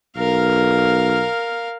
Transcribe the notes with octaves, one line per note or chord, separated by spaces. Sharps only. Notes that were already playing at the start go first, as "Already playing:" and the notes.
B1 A#4 F5